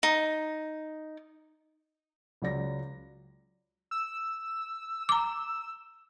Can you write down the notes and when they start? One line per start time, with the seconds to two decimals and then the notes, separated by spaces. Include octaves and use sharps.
0.03 D#4
2.42 C#2 F#3 D5 A#6
3.91 E6
5.09 A#5 D6